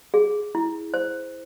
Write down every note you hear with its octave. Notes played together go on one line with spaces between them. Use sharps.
G#4
E4
C5